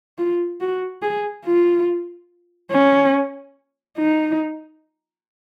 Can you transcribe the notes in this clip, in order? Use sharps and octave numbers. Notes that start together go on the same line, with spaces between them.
F4
F#4
G#4
F4
C#4
D#4